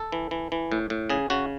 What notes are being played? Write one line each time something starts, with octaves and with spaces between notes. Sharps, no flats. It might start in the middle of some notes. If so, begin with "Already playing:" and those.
Already playing: A4
E3
E3
E3
A2
A2
C#3 G#4
C#3 F#4